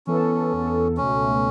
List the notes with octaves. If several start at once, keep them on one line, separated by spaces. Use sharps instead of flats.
E3 B3 C#4 A4
E2 E3 B3 A4
C#2 B2 A3 C#4